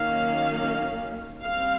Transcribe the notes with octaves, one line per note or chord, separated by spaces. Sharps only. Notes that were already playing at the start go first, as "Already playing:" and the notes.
Already playing: D#3 F#3 A#3 C#4 F5
G3 C4 F5